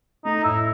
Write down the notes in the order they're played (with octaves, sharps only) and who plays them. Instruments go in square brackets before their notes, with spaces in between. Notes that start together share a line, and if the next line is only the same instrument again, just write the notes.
[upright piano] A3 [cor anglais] D#4
[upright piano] A2 [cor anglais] E4